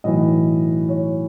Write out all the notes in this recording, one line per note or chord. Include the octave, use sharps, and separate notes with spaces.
B1 A2 E3 D#5
C#5